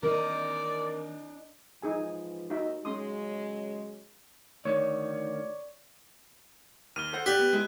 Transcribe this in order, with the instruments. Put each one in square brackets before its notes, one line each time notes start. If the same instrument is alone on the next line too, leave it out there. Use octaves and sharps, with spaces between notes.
[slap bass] D#3 E3 A#3 [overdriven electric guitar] D4 D#5 [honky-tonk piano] A#4 [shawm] D5
[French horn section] G#2 E3 F3 [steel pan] D#4 G#4 G#5
[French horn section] D#2 D#5 [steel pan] D#4 F#4 E5
[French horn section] C#3 F#3 G#3 [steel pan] C#4 C6 D#6
[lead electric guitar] D2 D#3 [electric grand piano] C#5 [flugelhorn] D5
[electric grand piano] D#2 F6 [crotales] D#7 G7
[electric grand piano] A4 C5 F#5
[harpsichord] G4 D5 [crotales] F#6 [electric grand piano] B6
[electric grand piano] B3
G#3 E4